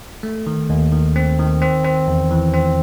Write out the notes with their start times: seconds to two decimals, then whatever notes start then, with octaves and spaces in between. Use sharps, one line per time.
0.23 A3
0.47 D#3
0.70 D#2
0.92 D#3
1.16 C4
1.39 D#3
1.62 C4
1.84 C4
2.08 E2
2.31 E3
2.54 C4